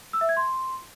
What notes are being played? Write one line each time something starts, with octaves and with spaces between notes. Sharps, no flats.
E6
E5
G#6
C6